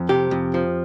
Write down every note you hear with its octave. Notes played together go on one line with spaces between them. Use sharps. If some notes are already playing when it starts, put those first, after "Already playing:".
Already playing: F2
C3 G4
F2
F3